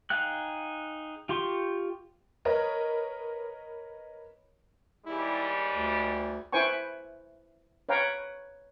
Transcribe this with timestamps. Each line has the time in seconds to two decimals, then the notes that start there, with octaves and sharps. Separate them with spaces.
0.10 D#4 G#4 F5 G5 F#6
1.29 F4 G4 C6 C#6
2.45 A#4 B4 C#5 D#5
5.06 D#2 G#2 G3 E4
5.75 D2
6.52 E4 B4 C5 G5 G#5 C#6
7.89 B4 C#5 F5 G5 A#5